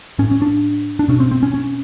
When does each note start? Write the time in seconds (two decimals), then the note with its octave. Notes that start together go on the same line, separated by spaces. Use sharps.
0.19 A2 C#4
0.31 C#4
0.42 D4
0.99 D4
1.08 B2 C#4
1.20 C4
1.31 C4
1.43 C#4
1.54 C#4